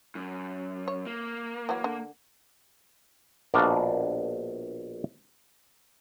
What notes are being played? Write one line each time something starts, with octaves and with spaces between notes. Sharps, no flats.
F#2
C#5
A#3
E3 F#3 F#4
D3
A#1 B2 D4 A#4 D5 F5